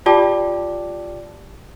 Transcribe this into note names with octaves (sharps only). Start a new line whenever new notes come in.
F4 G4 D5 G5 A5 D6